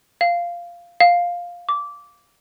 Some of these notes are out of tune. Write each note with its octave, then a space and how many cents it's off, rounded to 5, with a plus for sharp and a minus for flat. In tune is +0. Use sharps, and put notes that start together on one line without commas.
F5 -10
F5 +5
D6 -15